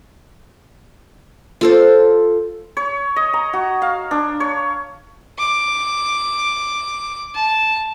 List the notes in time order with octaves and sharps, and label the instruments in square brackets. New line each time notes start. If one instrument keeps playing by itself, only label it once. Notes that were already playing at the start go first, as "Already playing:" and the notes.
[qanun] F4 A4 C5
[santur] C#5
D#5
A#5
F#4
F5
D4
C#5
[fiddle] D6
A5